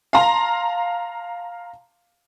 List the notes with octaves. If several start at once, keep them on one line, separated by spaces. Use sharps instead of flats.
F5 A5 A#5 C6